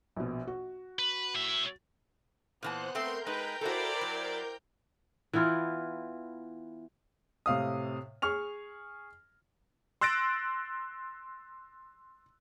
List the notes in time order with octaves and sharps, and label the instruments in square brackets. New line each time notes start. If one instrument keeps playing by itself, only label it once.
[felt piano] A#1 B2
F#4
[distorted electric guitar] B4
A2 E5
[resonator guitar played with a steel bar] A#2 E3 A5 [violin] B3 [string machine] C5 F#6
[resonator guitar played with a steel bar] A3 C4 G5 [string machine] A#4 G6 [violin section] C6
[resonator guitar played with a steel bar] G#3 D#4 [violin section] B4 [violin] G5 A#5
[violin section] E4 C5 D5 [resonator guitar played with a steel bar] F#4 A4
[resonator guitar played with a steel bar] F#3
[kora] E3 B3 E4 F4
[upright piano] A2 C3 F5 D#6
G#4 C#6 F6 F7
[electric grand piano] C6 E6 F#6 A6 A#6 D7